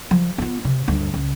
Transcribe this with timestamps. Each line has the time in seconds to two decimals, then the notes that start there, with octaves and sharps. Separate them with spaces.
0.11 F3
0.38 B3 F4
0.65 C3
0.88 D2 G2
1.14 C#2